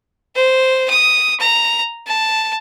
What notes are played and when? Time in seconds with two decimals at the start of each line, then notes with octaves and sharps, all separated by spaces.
0.35 C5
0.90 D#6
1.40 A#5
2.07 A5